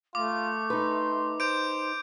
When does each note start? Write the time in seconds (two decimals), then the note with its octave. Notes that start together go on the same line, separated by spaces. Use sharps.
0.15 A3 F4 D6
0.70 D#4 B4 C6
1.40 C5 D6 G6 D7